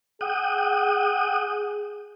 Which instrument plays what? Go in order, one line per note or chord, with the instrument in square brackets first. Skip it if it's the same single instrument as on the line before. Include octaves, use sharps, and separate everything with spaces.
[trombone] G#4 [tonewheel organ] F#5 G5 D#6